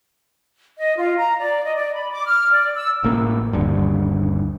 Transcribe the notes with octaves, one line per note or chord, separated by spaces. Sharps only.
D#5
F4
A#5
D5
D#5
D5
B5
D6
F6
D5
E6
A1 A#3
D#1 D2 G2